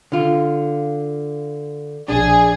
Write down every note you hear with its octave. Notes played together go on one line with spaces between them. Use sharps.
D3 F4
A#1 D4 G#4